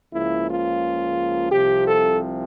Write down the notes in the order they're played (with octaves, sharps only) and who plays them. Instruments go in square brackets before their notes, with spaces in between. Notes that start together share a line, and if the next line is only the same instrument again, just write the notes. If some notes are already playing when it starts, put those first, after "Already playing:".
[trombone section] C#2 C#3 F3 A#3 E4
F4
C2 C3 F3 G4
A4